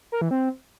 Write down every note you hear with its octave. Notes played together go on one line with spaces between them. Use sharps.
A#4
E3
C4